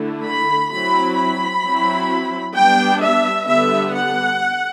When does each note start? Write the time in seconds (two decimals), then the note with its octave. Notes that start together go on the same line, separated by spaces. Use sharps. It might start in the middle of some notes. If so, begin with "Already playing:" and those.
Already playing: D3 A3 E4
0.25 B5
0.71 F#3 C4 E4 B5
1.17 B5
1.63 F#3 C4 E4
2.56 G3 B3 D4 G5
3.01 E5
3.47 D3 G3 B3 E5
3.94 F#5